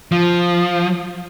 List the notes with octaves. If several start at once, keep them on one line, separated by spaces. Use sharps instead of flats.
F3